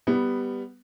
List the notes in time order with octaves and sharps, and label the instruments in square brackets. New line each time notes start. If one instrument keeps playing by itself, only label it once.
[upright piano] G3 B3